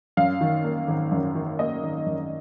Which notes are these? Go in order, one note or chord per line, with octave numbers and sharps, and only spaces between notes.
F#2 F5
D#3
A#3
G#1
F#2
D#3
A#3 D#5
G#1
F#2